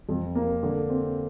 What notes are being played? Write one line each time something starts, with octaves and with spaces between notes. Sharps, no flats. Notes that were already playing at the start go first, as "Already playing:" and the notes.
F2
A#3
D3
C4